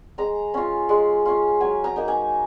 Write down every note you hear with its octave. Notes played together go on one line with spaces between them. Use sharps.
G#3 A#5
C#4 F4
G#3
C#4 F4
F#3 G#5
A#5
A#3 D#4
G#5